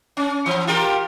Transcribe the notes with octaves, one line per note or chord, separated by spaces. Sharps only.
C#4
E3
F4 G4 A#4